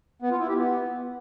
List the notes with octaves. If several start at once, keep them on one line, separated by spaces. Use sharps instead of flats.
B3
F4
E4
G4
B3